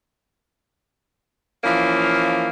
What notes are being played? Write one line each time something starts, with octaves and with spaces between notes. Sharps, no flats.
E3 F3 A#3 C#4